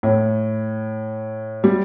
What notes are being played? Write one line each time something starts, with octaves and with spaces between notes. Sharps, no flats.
A2
G3